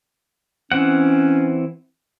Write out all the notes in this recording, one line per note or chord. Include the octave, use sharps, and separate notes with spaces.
E3 C4 C#4 F#5